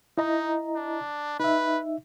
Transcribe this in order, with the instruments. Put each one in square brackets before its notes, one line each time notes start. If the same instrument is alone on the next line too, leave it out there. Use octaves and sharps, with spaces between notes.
[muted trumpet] D#4 [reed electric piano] E4 D#5 A#5
[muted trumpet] D4
[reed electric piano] D#4 E5 [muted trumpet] B4